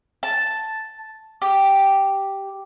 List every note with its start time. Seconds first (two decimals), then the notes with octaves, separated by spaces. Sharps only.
0.23 A5
1.42 G4